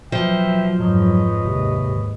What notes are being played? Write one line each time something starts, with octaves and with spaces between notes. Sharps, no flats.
B2 F3 F#3 B4 E5 G5
F2 G#2 F#3 B4 C#5 D#5
D#2 G#2 C3